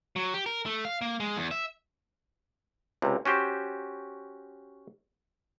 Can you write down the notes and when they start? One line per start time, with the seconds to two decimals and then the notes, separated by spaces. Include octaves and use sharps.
0.16 F#3
0.34 G4
0.46 A#4
0.66 A3
0.85 F5
1.01 A#3
1.20 G#3
1.37 E2
1.51 E5
3.02 C#2 C3
3.25 C#4 F#4 G4 C5